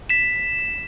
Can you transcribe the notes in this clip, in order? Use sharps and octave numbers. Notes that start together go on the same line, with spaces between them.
B6 E7